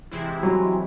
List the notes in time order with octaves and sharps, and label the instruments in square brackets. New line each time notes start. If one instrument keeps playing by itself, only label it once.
[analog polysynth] C3 E3 G#3 C4 E4
[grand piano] F#3